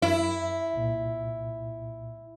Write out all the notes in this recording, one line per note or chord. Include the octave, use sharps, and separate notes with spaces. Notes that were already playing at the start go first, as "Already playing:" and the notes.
F#2 E4
C2 A#2